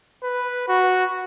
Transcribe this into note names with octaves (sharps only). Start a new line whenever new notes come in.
B4
F#4